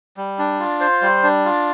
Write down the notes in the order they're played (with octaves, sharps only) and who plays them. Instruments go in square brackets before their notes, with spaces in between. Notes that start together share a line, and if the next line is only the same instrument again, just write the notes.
[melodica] G3
D4
F4
C5
G3
D4
F4